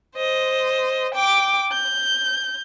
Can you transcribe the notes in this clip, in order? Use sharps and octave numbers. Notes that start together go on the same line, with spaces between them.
C5 D#5
G5 D6
G6